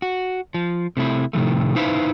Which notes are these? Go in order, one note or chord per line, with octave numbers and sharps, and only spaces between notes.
F#4
F3
C3 A3 E4
A2 C3 D#3 F3 A3
D#4 E4 B4 C5 E5 F5